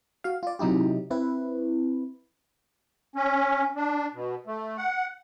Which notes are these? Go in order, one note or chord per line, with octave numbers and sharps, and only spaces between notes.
F#4 F5
F4 D5
C3 F#3 D#4 E4 G4
C4 E4 B4
C#4
D4
B2
A3
F#5